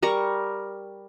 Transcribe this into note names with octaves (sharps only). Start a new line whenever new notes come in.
G3 A#4 C#6